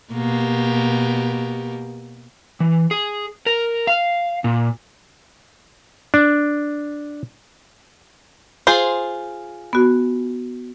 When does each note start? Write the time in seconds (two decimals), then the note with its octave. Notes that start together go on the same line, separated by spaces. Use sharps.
0.13 B2 A#3 G4
2.60 E3
2.91 G#4
3.46 A#4
3.87 F5
4.44 A#2
6.14 D4
8.67 F4 G#4 C5
9.73 B3 F#4